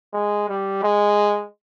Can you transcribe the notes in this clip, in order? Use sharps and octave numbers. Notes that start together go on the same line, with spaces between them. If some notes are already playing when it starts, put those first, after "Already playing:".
G#3
G3
G#3